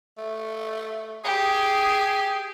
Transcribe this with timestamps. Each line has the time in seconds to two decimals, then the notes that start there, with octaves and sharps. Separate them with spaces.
0.18 A3
1.24 G4 G#4